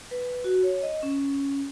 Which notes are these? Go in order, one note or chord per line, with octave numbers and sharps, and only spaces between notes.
B4
F#4
C#5
D#5
C#4